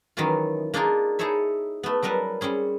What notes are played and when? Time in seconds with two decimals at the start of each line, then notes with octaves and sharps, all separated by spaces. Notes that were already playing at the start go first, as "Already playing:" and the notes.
0.17 D#3 E3 F#3 C#4 F4
0.74 A#3 D4 D#4 F4 G#4 A#4
1.19 D#4 E4 G#4 A4 C#5 E5
1.83 A3 B3
2.03 F#3 G3 A#4 B4 A5
2.41 G3 C4 C#4 G#4